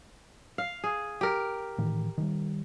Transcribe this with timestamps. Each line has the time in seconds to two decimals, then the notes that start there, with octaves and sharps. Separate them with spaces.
0.58 F5
0.84 G#4
1.21 G4 A#4
1.78 A2 D#3 E3
2.18 D#3 E3 G3